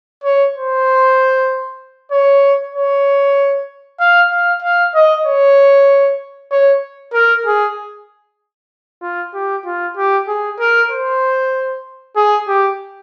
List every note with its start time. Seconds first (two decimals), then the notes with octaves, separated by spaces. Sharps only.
0.24 C#5
0.56 C5
2.12 C#5
2.75 C#5
4.00 F5
4.31 F5
4.63 F5
4.95 D#5
5.25 C#5
6.52 C#5
7.14 A#4
7.46 G#4
9.02 F4
9.35 G4
9.66 F4
9.97 G4
10.28 G#4
10.60 A#4
10.91 C5
12.16 G#4
12.48 G4